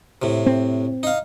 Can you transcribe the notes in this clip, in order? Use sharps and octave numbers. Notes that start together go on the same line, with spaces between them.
A2 C3
C4
D#4 F5